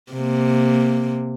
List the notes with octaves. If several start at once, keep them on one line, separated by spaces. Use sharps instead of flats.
C3 A#3